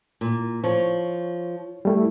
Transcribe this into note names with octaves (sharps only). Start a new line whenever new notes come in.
A#2
F3 C#5
G3 A3 E4